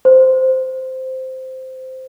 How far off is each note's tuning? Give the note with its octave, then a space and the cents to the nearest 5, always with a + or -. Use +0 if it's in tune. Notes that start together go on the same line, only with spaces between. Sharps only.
C5 -5